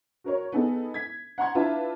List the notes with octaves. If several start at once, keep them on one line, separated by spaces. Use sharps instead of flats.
F#4 A#4 C#5
B3 D#4 G#4 A4
G#6 B6
F#5 A#5 C6 G#6
D4 E4 F4 B4 E5 A5